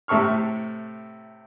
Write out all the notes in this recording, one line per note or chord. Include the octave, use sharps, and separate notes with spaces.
A2 C3 A4 C#6 F6